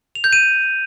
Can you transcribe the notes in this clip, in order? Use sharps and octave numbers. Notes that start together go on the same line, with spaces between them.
F7
G6
D#7